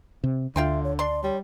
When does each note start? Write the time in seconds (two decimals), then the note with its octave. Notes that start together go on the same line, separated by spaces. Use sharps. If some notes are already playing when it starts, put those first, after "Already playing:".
0.24 C3
0.56 D2 D3 F4 E5 G5 C6
0.84 C#5
0.99 D4 D5 C6
1.23 G3 C#5